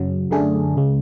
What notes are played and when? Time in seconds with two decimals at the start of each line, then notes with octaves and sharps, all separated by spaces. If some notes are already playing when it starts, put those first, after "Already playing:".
Already playing: F#2 C#3 F#3
0.31 F#2 D3 A3 D4 G#4
0.76 C#2 C#3 G#3